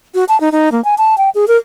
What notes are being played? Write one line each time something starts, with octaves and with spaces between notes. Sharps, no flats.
F#4
A5
D#4
D#4
A#3
G#5
A5
G5
G#4
A#4